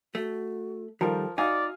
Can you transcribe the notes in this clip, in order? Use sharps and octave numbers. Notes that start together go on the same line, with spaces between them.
A3 F#4
D#3 F3 G3 A4 A#4
D#4 F#4 D5 F5 G#5